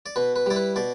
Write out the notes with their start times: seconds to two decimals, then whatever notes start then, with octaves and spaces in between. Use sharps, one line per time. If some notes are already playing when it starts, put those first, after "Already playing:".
0.06 D5
0.16 B2 B4
0.36 B4
0.46 G3 E4 D5
0.56 B4
0.76 B2 D5